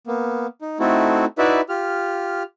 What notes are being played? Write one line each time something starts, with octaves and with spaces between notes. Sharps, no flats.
A#3 B3
D#4
A3 C4 D#4 E4 F#4 A4
D#4 E4 F#4 B4 D5 E5
F4 G4 F6